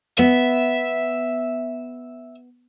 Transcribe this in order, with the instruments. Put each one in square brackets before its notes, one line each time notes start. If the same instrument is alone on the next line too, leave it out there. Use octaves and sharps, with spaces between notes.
[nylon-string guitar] B3 [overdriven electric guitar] E5